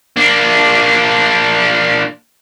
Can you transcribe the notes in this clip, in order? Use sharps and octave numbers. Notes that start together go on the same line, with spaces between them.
A#3 D4